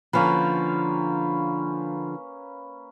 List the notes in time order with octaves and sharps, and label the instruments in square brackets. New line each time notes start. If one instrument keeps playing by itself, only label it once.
[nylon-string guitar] D3 F3 [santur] A#3 C#4 B4